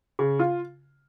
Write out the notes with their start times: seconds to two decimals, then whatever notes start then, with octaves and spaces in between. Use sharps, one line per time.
0.19 C#3
0.39 F4